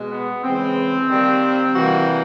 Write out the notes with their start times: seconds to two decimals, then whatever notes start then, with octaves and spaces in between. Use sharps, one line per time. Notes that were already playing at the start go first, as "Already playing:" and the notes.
Already playing: B2 G#3
0.08 B3
0.41 C#3 E3 G#3 C4
1.08 D#3 G3 A#3
1.75 C3 E3 G3 A#3 F#4